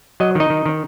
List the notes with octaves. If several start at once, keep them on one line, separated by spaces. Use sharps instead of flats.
F#3 D#5
D#3 D#4 D#5
D#3
D#3